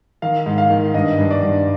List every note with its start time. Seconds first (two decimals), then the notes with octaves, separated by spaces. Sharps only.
0.22 D#3 F5
0.46 G#2
0.58 F5
0.70 D#3
0.94 G2 D#5
1.18 G2
1.31 D5
1.42 G2